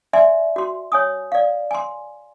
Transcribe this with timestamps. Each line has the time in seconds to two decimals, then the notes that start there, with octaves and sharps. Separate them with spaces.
0.13 D5 E5 G#5 C6
0.56 F#4 C6
0.92 C#5 G#5 D#6
1.32 D5 F5
1.71 G#5 C6